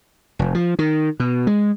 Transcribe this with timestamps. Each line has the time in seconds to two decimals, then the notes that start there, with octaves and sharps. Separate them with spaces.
0.39 F1
0.55 F3
0.79 D#3
1.20 B2
1.47 G#3